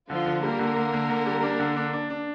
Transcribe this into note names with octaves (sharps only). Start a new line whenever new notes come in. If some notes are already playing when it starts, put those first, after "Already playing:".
D3 F3 F4
D3
G3 A#3 A#4
D3
D3
D3
D3
G3
D4
D3
D4
D4
D4